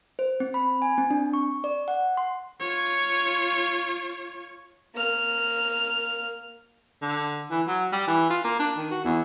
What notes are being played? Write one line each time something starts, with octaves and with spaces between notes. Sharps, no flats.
C5
C4
B5
G#5
C4
D4
C#6
D5
F#5
C6
F4 C#5
A#3 F6
D3
E3
F#3
G3
E3
F4
A#3
D4
D#3
F#4
E2